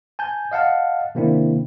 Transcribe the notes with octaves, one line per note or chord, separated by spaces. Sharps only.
G#5 A5 G6
D#5 F5 F#5 A5
C3 D#3 A#3 C4 D4 E4